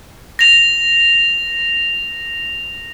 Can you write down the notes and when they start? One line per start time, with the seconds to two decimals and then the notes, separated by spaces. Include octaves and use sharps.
0.39 A#6 F7